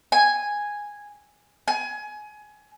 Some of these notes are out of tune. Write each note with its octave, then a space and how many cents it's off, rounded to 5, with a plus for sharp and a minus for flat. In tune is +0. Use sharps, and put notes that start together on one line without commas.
G#5 -5
G#5 +25